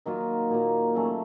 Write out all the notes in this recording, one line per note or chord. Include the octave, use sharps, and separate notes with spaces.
D#3 F#3 A#3 F4
A#2 F#3 A#3
C#3 F#3 A3 C#4